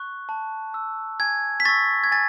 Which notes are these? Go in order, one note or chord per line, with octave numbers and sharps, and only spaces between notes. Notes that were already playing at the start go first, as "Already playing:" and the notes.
Already playing: C#6 F#6
A5
E6
G#5 G#6
B6
C#6 E6 A6
G#6
G#5 A6